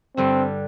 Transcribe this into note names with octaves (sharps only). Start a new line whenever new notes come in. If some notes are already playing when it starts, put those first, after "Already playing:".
G2 D3 G3 C4